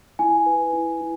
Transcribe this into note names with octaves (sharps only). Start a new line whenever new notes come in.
E4 G#5
B4
E4
E4